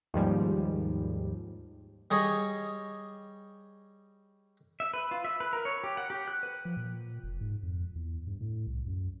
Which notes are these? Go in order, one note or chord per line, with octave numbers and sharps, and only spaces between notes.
D#2 G#2 F3 G3
G3 G#4 C#5 D#5
E5
B4
F4
E5
B4
A#4
C#5
G4
F#5
G4
F#6
B4
F3
A#2
F1
G#2
F2
E2
G2
A2
C2
F#2